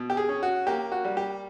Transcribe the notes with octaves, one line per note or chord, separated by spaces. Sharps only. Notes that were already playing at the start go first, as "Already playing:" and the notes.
Already playing: B2
G4
G#4
C#4
F#4
A#3 G4
F#4
G3
G4